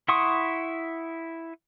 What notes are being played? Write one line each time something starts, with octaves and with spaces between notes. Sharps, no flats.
E4 F#5 C6 C#6 D#6